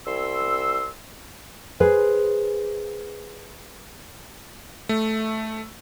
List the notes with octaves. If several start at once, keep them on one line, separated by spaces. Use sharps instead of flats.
C2 C6 E6
G#4 B4 C5
A3